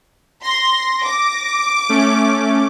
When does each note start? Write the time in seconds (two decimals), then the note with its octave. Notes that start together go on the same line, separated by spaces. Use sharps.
0.43 C6 A#6
1.03 D6
1.89 A3 C#4